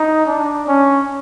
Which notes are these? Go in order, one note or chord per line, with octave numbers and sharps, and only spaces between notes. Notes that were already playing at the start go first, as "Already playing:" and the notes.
Already playing: D#4
D4
C#4